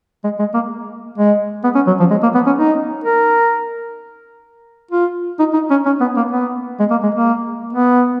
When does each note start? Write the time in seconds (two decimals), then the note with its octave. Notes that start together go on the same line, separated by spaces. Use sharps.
0.24 G#3
0.39 G#3
0.54 A#3
1.18 G#3
1.64 B3
1.75 C#4
1.87 F#3
2.00 F3
2.10 G#3
2.23 A#3
2.35 B3
2.46 C#4
2.58 D#4
3.04 A#4
4.91 F4
5.39 D#4
5.53 D#4
5.70 C#4
5.86 C#4
6.01 B3
6.16 A#3
6.31 B3
6.80 G#3
6.91 A#3
7.03 G#3
7.15 A#3
7.73 B3